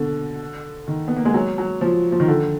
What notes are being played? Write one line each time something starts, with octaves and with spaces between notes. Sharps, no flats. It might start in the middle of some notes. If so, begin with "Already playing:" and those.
Already playing: B2 D3
D#3
B3
A#3
G#3
F#3
F#3
F3
F3
D#3
D3